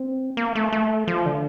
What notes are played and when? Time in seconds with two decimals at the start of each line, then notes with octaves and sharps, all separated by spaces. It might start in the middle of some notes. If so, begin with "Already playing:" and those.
Already playing: C4
0.37 A#3
0.55 A3
0.72 A3
1.08 F3
1.26 D3